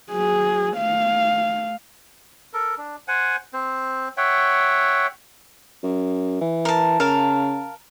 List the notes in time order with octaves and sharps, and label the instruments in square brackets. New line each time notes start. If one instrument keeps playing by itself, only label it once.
[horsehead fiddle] F#3 G#4
A3 F5
[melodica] A4 A#4
D4
C5 F#5 G#5
C4 C5
C#5 E5 F#5 G5
[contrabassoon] F#2
E3
[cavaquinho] A#4 A5
[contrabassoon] C#3 [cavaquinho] A#4 F5 A5